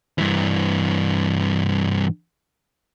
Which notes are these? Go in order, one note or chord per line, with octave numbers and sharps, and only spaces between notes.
G2 E3